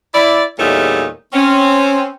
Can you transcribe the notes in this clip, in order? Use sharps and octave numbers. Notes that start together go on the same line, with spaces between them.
E4 D5
E2 A#2 G3 A3 D#4 C#5
C4 C#4